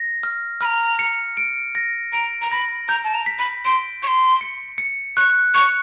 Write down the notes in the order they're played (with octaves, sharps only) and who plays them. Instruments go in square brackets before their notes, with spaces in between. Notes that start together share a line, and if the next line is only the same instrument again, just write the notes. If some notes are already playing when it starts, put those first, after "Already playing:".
Already playing: [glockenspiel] A#6
F6
[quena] B5 [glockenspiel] F6
[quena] A#5
[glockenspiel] C#7
D7
A#6
[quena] A#5 [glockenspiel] D7
[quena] A#5
[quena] B5 [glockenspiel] A#6
[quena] A#5 [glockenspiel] G6
[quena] A5
A#5
[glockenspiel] B6
[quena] B5
[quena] C6 [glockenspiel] D7
[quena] C#6 [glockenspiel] G6
[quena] C6
[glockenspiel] C#7
C#7
[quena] C#6 [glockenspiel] F#6
[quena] C#6 [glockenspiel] C#7